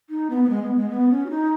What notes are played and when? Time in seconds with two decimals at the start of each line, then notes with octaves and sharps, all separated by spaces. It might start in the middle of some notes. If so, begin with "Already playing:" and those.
0.10 D#4
0.30 B3
0.44 B3
0.50 G#3
0.63 B3
0.76 G#3
0.90 B3
1.10 C#4
1.26 F#4
1.30 D#4